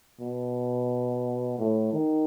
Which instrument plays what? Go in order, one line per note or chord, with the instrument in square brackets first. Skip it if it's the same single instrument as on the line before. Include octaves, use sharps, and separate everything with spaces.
[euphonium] B2
A2
D#3